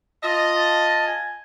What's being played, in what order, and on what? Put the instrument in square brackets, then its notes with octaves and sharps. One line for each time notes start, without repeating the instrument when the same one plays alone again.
[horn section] F4 D#5 [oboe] A5
[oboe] A5
G#5